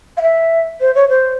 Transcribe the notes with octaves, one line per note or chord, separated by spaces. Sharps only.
F5
E5
C5
C#5
C5